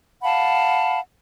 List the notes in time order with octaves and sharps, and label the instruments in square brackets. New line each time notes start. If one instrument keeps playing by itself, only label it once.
[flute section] F5 F#5 A5 B5